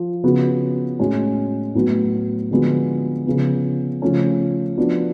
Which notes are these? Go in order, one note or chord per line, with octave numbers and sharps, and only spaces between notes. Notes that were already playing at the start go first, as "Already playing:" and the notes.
Already playing: F3
C#3 F3 B3 F#4
A2 G#3 C#4 F#4
A2 F#3 B3 F#4
D3 F3 G#3 B3 F#4
C#3 F3 B3
C#3 F3 A3 C#4
F3 B3 D4 F#4